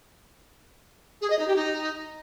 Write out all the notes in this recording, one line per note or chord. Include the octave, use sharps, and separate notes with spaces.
G#4
D#5
D#4
G4
D#4